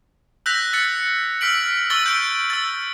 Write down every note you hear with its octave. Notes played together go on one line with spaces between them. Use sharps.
E6 F#6 G6 A#6 B6 F7
E6 A6 C#7
E6 F6 B6 D7 F#7
C#6 E6 A6 G7
E6 G6 D7
E6 A6